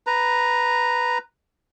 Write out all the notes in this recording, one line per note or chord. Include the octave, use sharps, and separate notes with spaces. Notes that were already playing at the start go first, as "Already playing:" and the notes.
B4 A#5